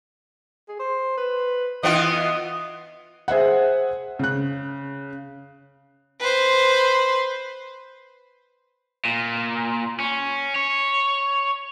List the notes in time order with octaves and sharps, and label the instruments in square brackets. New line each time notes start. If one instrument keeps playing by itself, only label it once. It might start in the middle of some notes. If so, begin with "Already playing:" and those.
[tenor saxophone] G#4
C5
B4
[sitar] E3 B3 F4 [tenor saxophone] D#5
[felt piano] G#4 C5 E5 F#5
C#3 F#6
[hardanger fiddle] B4 C5
[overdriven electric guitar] A#2
C#4
C#5